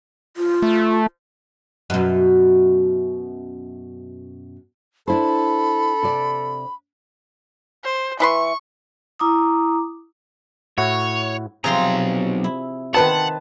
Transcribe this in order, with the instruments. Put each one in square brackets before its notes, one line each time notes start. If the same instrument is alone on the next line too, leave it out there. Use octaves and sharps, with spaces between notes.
[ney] F4
[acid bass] A3
[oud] F#2 B2
[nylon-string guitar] D4 E4 C5 [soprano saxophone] A4 [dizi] B5
[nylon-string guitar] C3 D5
[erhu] C5
[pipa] E3 B4 C6 [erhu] C#6
[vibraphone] E4 A#5 D6 D#6
[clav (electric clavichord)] A2 E4 F#4 [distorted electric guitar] C#5
[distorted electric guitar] B1 A#5 [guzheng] C3 F3 C6 [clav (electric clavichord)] G#4
[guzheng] E4
[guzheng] D#3 C5 G5 [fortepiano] B4 A5 [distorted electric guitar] F#5